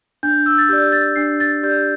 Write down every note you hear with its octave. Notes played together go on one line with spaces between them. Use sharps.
D4 G6
E6
A6
G4 D5 G6
A6
D4 C7
A6
G4 D5 G6